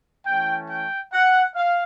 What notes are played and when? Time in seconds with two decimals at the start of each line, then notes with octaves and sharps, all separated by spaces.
0.25 E3 A3 C#4 G5
0.68 G5
1.12 F#5
1.55 F5